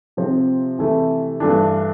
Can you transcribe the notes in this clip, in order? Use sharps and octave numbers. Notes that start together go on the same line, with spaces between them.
C3 F3 C4
C3 E3 A3 E4
G2 E3 A3 D4